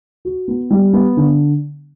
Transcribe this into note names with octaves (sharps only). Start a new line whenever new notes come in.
F#4
B3
G3
B3
D3